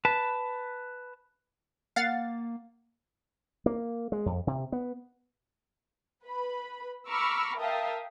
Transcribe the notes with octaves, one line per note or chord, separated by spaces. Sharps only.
B4 A5
A#3 F5 F#5 A6
A#3
G#3
F2
C3
B3
B4 B5
A#5 B5 C#6 D6 E6 F6
A#4 E5 F5 G5 A5 D#6